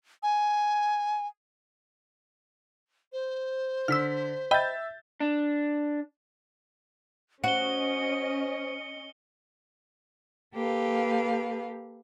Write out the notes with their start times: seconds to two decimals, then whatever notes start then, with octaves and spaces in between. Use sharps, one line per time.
0.23 G#5
3.13 C5
3.88 D3 E6 F6 B6
4.51 D#5 E5 G5 B5 G6 A6
5.20 D4
7.44 C#4 F#4 C5 D#5 C#7 G7
10.54 A#3 G4 A4 B4 F5